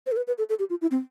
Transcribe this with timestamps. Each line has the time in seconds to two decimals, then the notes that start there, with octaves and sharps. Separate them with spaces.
0.06 C5
0.12 A4
0.17 B4
0.27 B4
0.38 A4
0.49 A4
0.59 G4
0.70 F4
0.82 E4
0.91 C4